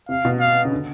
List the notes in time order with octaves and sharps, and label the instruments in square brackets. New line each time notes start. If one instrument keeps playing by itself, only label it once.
[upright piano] C3 [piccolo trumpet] F5
[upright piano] B2
[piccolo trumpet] F5
[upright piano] C#3
D3